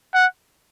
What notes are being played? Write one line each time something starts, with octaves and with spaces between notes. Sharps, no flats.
F#5